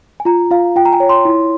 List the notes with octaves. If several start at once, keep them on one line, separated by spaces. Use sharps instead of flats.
G#5
F4 A#5
F4 F5
F4 G5
A#5
G#5
C#5
C6
E4